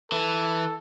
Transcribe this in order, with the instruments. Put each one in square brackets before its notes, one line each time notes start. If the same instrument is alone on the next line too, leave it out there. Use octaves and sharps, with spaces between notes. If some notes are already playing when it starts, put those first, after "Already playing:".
[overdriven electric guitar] E3 [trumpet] A4